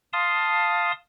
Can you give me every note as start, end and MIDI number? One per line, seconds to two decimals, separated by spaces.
0.13 0.92 77
0.13 0.92 81
0.13 0.92 84
0.13 0.92 87